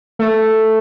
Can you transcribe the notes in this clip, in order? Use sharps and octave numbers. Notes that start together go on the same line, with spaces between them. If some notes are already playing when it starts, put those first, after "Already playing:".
A3